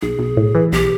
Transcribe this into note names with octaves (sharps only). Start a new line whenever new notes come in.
B1 G#4
B1
A2
E3
B1 G4